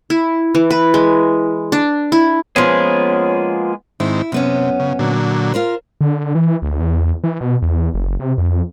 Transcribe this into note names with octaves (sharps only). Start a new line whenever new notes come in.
E4
E3
B4
G#3
D4
E4
F3 G#3 A#3 B3 C#4 G#4
G#2 D#3 C4 E4
F#2 C3 B3 C#4
C#3
A#2 D3 F#3
F4 A#4 C5
D3
E3
D2
E2
E3
B2
E2
F#1
C3
F2